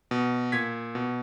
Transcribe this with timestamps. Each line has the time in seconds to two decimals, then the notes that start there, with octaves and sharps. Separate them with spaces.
0.11 B2
0.52 A#2 G#6 B6
0.95 B2